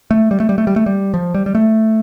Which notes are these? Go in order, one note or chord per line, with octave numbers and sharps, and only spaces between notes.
A3
G3
A3
G3
A3
G3
A3
G3
F3
G3
G3
A3